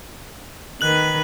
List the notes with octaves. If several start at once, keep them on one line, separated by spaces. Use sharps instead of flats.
D#3 B4 F#6 F#7